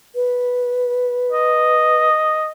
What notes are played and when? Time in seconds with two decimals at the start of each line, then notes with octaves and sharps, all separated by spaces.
0.15 B4
1.32 D#5